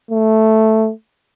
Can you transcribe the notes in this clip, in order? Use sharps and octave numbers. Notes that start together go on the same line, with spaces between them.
A3